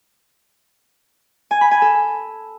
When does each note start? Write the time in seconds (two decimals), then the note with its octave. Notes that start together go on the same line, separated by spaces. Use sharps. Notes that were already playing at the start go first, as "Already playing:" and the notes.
1.51 G#5
1.61 B5
1.71 G#5
1.82 A4